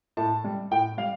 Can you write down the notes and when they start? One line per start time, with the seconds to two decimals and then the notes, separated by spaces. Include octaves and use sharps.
0.17 A2 A5
0.44 G3
0.71 A2 G5
0.98 G3 F5